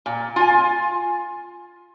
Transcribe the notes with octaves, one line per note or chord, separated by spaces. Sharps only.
A#2
F4 G#5